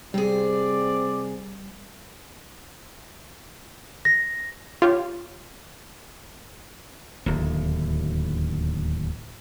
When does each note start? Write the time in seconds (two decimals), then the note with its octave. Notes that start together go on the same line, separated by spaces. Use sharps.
0.14 C3 G3 C4 G#4 D5
4.05 A#6
4.82 F4 G4 C#5
7.26 D1 D#2